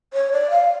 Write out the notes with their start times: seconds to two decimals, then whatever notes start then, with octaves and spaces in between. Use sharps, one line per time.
0.13 C#5
0.32 D5
0.50 F5